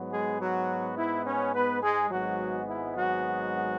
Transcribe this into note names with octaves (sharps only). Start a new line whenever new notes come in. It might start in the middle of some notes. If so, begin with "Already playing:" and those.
Already playing: G#2 F#3 B3
G#3 G#4
F#3 F#4
E4
C#4
B3 B4
G#3 G#4
G#1 G#2 F#3 G#3 B3 F#4
E4
F#3 F#4